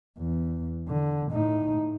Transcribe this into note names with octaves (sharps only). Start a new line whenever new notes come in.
E2
D3
A2 D#4